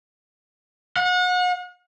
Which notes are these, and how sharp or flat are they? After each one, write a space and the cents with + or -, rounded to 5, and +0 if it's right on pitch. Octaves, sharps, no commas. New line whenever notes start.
F#5 -35